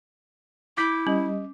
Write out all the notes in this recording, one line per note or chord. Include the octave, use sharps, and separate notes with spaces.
E4 D6 G6 B6
G3 C#4 D#5